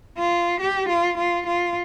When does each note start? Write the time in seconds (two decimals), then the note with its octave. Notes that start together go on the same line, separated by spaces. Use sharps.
0.18 F4
0.60 G4
0.89 F4
1.18 F4
1.46 F4